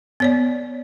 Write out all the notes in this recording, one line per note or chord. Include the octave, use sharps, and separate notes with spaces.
B3 C#5 D5